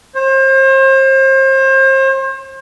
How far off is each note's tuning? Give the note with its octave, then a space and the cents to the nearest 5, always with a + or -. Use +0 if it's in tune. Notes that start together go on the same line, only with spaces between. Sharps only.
C5 +35